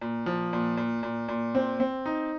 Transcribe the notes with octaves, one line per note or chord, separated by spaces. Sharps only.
A#2
F3
A#2
A#2
A#2
A#2
C4
C4
D#4